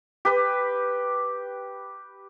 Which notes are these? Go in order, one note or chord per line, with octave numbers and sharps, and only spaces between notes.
G4 B4